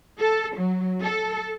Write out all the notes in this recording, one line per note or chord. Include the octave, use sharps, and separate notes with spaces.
A4
F#3
A4